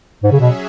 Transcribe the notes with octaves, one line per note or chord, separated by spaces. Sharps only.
G#2 F#3 C#4 G#4 E5
C#3
B2